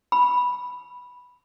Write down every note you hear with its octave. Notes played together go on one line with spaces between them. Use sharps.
B5